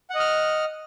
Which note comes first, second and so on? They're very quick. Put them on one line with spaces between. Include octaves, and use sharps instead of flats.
F#5 D#5 F6